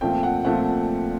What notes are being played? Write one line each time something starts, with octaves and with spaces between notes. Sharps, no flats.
A#2 F3 A3 C4 G5
F#5
A#2 F3 A3 C4 F#5